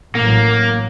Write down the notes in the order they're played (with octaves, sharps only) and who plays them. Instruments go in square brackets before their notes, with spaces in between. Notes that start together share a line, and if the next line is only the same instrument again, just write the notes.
[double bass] A1 F#3 [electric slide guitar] A#3